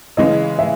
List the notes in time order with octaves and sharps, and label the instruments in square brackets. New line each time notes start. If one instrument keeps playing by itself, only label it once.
[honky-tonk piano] C#3 E3 G#3 [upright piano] D#5
[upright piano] E5